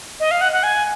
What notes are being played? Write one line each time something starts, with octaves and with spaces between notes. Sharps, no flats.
D#5
F5
F#5
F#5
G#5